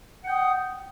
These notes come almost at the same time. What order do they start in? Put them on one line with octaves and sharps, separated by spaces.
F#5 G5 D#6